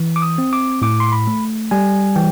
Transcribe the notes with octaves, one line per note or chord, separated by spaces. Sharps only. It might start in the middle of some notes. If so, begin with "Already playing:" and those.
Already playing: E3
D6
D#6
C4
D6
A2 D6
C6
B5
A3
G3 G#5
E3 G5